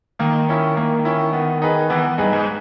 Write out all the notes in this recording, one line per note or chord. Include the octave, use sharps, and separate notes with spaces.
D#3 A#3
C#4 E4
A#3
C#4 E4
B3
D#4 G#4 B4
E3 B3
G2 D#4 G#4 B4
G#2